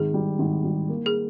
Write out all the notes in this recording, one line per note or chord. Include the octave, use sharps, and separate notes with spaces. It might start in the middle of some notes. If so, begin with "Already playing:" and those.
Already playing: G#1 G#4
G3
G#1
G3
A#3
G#4